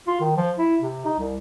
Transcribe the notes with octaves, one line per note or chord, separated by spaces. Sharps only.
F4
D#3
F3
E4
C3
D#4
C2